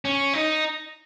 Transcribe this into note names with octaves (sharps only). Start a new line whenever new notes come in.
C#4
D#4